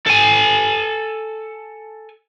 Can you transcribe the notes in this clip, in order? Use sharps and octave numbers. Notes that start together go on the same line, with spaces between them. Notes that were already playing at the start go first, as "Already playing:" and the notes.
A4 G#5